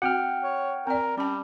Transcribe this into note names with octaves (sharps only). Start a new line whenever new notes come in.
C4 F#4 F#5 G5 F6
C#5
C4 A#4 D5
G3 C#4 A5